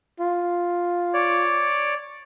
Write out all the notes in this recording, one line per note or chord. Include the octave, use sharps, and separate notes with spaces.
F4
C#5 D5